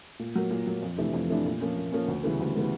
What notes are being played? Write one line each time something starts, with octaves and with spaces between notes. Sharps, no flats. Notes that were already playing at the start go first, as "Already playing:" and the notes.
A#2
F#3 A#3
A#2
F#3 A#3
F2
C3 E3 A3 D4
F2
C3 E3 A3 D4
A#2
F3 A#3 C#4
A#2
F3 A#3 C#4
D2
C#3 E3 G3 B3
D2
C#3 E3 G3 B3